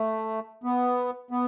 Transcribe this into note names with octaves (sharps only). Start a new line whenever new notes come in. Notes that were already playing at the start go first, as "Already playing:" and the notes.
Already playing: A3
B3
B3